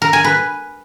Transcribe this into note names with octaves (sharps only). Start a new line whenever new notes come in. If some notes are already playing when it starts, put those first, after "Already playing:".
A#4
G#5
B4